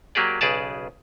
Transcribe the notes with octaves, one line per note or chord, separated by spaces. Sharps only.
F#3 A#3 G4 G#4 D5
B1 C#3 G#4 B4 D5 A5